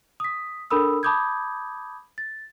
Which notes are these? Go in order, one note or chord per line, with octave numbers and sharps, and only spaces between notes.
D#6 B6
D4 A4 A#4 B5 D#6 E6
A5 B5 D6 D#6 G6 G#6
A6